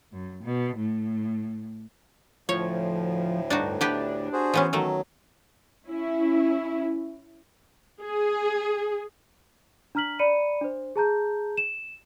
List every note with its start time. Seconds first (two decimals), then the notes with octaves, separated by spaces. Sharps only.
0.12 F#2
0.44 B2
0.77 A2
2.49 D2 A2 F3 C#5
3.50 G2 D4 D#4 F#4
3.81 B3 D4 G4 B4
4.33 F#4 G#4 C5
4.54 E3 B3 C#4
4.73 D#3 F#3 A3
5.87 C#4 E4
8.02 G#4
9.95 D4 A#5 F6 B6 F#7
10.19 D5 A#5 B5 C#7 D#7
10.61 D4 C5
10.96 G#4 A5 A#5 G6
11.57 E7